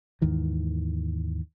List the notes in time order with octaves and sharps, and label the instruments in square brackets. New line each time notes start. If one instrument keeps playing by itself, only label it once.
[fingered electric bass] D#2 G#2 D#3 E3